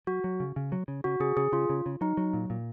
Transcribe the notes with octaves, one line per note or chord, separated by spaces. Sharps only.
F#3 F#4
F#3
C#3
C#3
F#3
C#3
C#3 F#4
C#3 G#4
C#3 G#4
C#3 F4
C#3
C#3
F#3 D#4
F#3
A#2
A#2